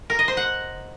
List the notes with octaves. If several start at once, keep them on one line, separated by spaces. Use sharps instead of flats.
A#4
D#5
C5
F#5